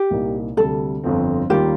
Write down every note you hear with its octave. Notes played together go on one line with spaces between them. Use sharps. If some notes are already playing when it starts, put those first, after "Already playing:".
Already playing: G4
C2 A#2 G3 A#3 D#4
D2 C3 G3 A4
G1 F2 D3 F3 C4
D#2 D#3 G3 A#3 F4 G4